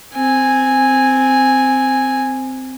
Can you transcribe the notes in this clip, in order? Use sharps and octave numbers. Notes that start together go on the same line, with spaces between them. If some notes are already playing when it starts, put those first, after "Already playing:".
C4 G#5